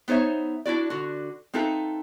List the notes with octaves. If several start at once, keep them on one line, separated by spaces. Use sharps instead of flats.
B3 D#4 C5 C#5 E5
D4 E4 F#4 D5
D3 F#4
C4 D#4 F4 A4 B4 E5